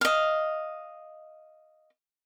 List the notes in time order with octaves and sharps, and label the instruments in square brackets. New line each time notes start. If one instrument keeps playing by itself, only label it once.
[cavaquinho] D#5 F5